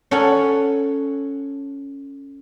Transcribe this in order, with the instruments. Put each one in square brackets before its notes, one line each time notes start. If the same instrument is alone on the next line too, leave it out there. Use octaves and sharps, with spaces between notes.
[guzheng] C#4 A4 F#5 G#5